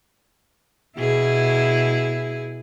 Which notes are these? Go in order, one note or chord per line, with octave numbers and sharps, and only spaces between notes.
B2 E4 G#4